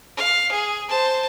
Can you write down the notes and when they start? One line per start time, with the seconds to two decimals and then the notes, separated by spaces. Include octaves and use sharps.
0.17 F5
0.51 G#4
0.89 C5 A5